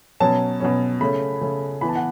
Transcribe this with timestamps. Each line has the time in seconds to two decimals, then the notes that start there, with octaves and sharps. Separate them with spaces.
0.20 B2 F#3 C#4 A5
0.60 B2 F#3 C#4
1.01 C#3 A3 C#4 B5
1.41 C#3 A3 C#4
1.81 E3 B3 B5
1.89 A5
1.96 F#5